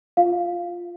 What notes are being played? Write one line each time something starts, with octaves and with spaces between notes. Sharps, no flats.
F4 F5